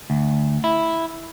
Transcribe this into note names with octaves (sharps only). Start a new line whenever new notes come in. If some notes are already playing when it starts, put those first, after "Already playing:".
D2
E4